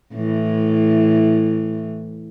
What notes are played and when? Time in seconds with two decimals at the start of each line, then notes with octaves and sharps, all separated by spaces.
0.14 A2 E3